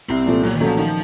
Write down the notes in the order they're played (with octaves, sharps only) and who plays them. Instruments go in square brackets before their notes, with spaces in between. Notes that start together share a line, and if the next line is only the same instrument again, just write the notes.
[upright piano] C2 [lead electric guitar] C4
[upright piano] A#2 F3 A3
[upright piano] A#2 [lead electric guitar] F#3
[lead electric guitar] D#3
[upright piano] F#3 A3 C#4
[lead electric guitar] F3
[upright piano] D#3 [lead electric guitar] F3